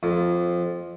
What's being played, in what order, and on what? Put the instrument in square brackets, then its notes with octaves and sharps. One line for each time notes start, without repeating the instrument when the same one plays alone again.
[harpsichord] F2